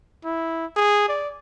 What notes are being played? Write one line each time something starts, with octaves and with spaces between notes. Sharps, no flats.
E4
G#4
D5